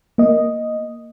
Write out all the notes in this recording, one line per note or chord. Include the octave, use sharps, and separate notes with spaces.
A#3 D#5